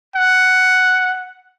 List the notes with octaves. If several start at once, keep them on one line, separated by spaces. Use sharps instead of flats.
F#5